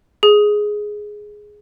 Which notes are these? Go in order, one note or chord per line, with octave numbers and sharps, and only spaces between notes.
G#4